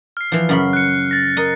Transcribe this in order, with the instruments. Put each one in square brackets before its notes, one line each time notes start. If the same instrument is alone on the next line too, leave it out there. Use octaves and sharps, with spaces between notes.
[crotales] F6 C7
[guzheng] E3 F3
F#2 C#3 B5
[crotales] F#6 C#7
A6 A#6
[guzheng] A#4 D#5